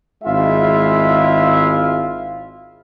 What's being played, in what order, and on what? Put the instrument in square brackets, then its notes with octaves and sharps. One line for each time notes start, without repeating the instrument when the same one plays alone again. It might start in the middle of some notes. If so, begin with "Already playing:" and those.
[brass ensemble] G#1 G#3 E4 F4 E5 F5